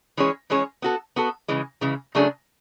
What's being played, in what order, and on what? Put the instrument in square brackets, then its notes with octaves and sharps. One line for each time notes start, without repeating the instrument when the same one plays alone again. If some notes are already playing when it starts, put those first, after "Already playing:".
[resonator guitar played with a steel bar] E3 G#3 C#4 G#4 C#5
E3 G#3 C#4 G#4 C#5
B3 F#4 A4
B3 F#4 A4
C#3 E3 G#3
C#3 E3 G#3
C#3 F#3 A3 D4 G#4